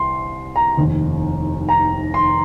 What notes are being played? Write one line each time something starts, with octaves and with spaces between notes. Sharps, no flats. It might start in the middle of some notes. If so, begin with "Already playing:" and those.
Already playing: C2 C3 C6
A#5
F1 D#2 D#3
A#5
C6